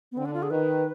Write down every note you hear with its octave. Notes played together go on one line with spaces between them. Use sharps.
B3
D3 C4
D4
F4
G#4
D#3 B4